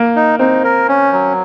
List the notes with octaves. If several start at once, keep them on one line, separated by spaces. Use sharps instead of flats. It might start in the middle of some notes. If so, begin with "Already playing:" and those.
Already playing: A#3
D#4
C4 D#4
A#4
C#4
F#3